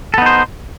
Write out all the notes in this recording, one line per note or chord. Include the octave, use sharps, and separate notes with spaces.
B3 D#4 A4 C5